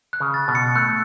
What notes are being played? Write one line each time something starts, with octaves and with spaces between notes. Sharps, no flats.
F#6
C#3
A6
B2
C#7
A3 F#6